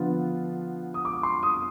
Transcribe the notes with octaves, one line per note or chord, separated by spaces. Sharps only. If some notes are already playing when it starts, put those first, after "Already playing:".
Already playing: D3 F3 B3 F4
D#6
D6
C6
D#6